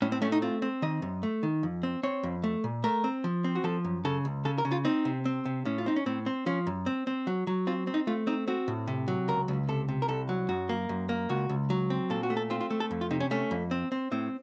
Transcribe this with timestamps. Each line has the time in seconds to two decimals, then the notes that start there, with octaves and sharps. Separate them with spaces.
0.02 A2 C#4
0.12 C4
0.22 A3 C#4
0.32 D#4
0.42 C4 F4
0.62 C4
0.82 D#3 D#5
1.02 F#2
1.23 A3
1.43 D#3
1.63 F2
1.83 C4
2.03 C4 C#5
2.23 F2
2.44 A3
2.64 A#2
2.84 A3 A#4
3.04 C4
3.24 F3
3.44 C4
3.55 F#4
3.64 F3 A4
3.85 F#2
4.05 C#3 A4
4.25 C#2
4.45 C#3 A4
4.58 A#4
4.65 C#3
4.72 F4
4.85 C4 D#4
5.05 C3
5.25 C4
5.45 C3
5.65 A2 C#4
5.78 F4
5.86 C4 D#4
5.96 C#4
6.06 A2 C4
6.26 C4
6.46 F3 C#4
6.67 F#2
6.86 C4
7.07 C4
7.27 F#3
7.47 F#3
7.67 C4 F4
7.87 C4
7.94 D#4
8.07 A3 F4
8.27 C4 D#4
8.48 C4 F#4
8.68 A2
8.87 C3
9.08 F#3
9.28 C#2 A#4
9.48 C#2
9.69 C3 A4
9.89 C3
10.02 A#4
10.08 C2 A4
10.29 F#3
10.49 F#2 F#4
10.69 A#3
10.89 F#2
11.09 A#3
11.29 C#2 F#4
11.49 C#2
11.70 F#3
11.90 C4
12.10 A#2 A4
12.23 F#4
12.30 A3
12.37 A4
12.50 C4 F4
12.61 F4
12.71 A3
12.80 A4
12.91 F2
13.01 F4
13.11 C3 D#4
13.20 C#4
13.31 A3 C#4
13.51 F2
13.71 C4
13.92 C4
14.12 A2 C4